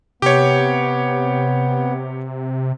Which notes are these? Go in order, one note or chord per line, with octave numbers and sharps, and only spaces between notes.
C3 B3 G4 C#5